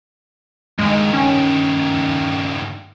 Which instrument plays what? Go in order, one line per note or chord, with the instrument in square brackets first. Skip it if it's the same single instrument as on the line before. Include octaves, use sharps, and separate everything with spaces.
[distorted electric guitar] G2 D#3 [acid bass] G#3
[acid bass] C#4